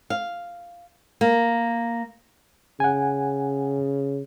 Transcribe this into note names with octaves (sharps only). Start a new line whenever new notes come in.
F5
A#3
C#3 F#5 G#5